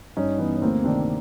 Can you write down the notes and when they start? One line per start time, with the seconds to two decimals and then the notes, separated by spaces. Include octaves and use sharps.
0.17 G2 C#4 D#4
0.39 E3 B3 C#4
0.54 C#4
0.62 D2 A#3 C4
0.84 C3 D#3 C4 D4